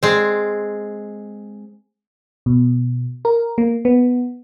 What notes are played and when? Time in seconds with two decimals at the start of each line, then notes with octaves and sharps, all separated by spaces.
0.03 G#3 C4
2.46 B2
3.25 A#4
3.58 A#3
3.85 B3